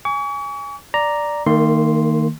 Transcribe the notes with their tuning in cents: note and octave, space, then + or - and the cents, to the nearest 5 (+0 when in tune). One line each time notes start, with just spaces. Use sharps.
G#5 -15 C#6 +40
D5 +0 A#5 +0
D#3 +0 A#3 -40 C6 +0